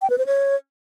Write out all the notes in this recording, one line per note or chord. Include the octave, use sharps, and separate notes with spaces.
G5
B4
C5
C#5